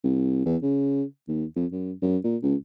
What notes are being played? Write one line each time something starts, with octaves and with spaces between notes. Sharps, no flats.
C2
E2
C#3
D#2
F2
F#2
F#2
A#2
C#2